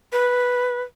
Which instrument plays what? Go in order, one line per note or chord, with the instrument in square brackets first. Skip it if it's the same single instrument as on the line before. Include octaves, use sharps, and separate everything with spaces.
[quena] B4